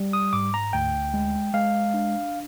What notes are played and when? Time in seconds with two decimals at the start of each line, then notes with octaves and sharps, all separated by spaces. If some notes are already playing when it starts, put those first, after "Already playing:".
Already playing: G3
0.13 D#6
0.33 G#2 D6
0.54 A#5
0.73 D2 G5
1.14 G#3
1.54 G#3 F5
1.94 D4